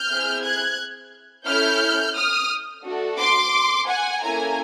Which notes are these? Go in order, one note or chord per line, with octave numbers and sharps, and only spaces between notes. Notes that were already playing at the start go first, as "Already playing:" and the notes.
Already playing: F6 G6
C4 E4 G#4
F#6 G#6
C#4 E4 A4 F6 G6
D#6 F6
A3 D4 F#4 A4
C6 D6
F#5 G#5
A#3 C#4 E4 A4 G#5 A#5